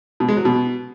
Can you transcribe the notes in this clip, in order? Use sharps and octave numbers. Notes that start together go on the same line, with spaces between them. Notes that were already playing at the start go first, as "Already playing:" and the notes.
B2
G#3
F#3
B2